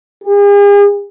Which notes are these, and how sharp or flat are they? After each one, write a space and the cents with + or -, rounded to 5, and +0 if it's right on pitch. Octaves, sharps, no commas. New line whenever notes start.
G#4 -45